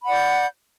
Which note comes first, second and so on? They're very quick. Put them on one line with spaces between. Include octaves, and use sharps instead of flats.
B5 F#5 D5 G6